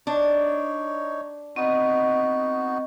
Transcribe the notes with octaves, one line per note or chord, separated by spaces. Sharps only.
D4 D#4 C#5
B3 C4 D#4 F#4 D#5